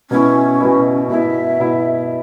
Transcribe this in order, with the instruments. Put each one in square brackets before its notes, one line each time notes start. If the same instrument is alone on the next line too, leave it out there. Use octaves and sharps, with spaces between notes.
[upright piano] B2 B3 E4 [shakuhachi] C#4
[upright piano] B2 B3 E4
[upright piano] B2 B3 E4 [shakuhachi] E5
[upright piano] B2 B3 E4